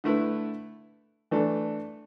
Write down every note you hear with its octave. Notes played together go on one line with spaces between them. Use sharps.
D3 A3 E4 B4
E3 A3 D4 A4